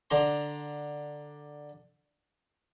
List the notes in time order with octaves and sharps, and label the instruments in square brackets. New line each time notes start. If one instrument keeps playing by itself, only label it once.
[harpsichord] D3 D4 A#5 C6